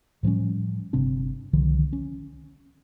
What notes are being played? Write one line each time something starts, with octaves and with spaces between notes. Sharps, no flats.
A2 F3 G3 C#4
G1 C3 C4 D4
C2 D3 D#3 F3
C#4